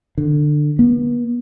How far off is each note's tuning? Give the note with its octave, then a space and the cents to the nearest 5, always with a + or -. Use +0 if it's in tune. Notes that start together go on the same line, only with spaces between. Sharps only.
D3 +20
B3 -40